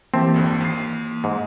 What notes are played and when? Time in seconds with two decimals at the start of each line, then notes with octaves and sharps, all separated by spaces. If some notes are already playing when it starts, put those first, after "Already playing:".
0.14 E3 A#3 C4 G4 E5 A5
0.34 G#1 F2 D3
0.61 D#2 C7
1.24 G#2